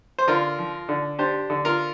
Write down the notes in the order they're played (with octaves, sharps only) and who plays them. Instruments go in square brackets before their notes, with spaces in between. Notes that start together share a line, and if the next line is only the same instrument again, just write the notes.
[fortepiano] C5
D3 F4 A#4
F3
D3
D4 G4 C5
D3
F4 A#4